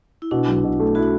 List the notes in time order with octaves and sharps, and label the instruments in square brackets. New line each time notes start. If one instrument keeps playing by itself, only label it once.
[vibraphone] E4
[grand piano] B2 [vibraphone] D4
[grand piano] B1
B2
A3
[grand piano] E4 [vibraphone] F#4